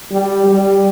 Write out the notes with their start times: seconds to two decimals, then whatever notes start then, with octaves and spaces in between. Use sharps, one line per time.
0.12 G3
0.47 G3